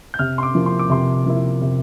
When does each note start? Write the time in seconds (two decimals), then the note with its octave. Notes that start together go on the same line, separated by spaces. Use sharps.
0.14 G6
0.19 C3 F6
0.38 C6
0.43 D6
0.55 F3 A#3 E4
0.66 C6
0.79 D6
0.90 C3 C6
1.26 F3 A#3 E4
1.62 C3